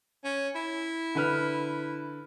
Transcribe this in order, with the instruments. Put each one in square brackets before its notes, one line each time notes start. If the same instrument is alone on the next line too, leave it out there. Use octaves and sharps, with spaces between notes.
[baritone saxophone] C#4
E4
[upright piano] D3 B4 F6